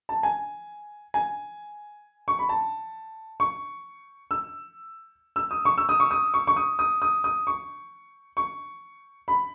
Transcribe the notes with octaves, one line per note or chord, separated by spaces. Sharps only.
A5
G#5
G#5
C#6
B5
A5
C#6
E6
E6
D#6
C#6
E6
D#6
C#6
D#6
C#6
C#6
D#6
D#6
D#6
D#6
C#6
C#6
B5